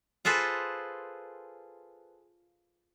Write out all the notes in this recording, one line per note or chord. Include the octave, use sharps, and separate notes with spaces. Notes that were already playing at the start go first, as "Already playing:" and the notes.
F4 G#4 A4 B4 C5